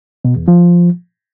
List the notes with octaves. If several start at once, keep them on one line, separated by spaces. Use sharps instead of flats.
B2
E2
F3